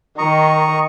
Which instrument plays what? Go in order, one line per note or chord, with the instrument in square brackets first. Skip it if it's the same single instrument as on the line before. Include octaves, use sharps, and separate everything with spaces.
[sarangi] D#3 [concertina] D#5 A#5 C#6